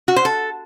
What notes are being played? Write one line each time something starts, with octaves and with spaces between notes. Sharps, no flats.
F#4
C5
A4